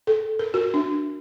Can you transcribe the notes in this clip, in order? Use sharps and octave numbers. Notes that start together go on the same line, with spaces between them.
A4
A#4
F#4
D4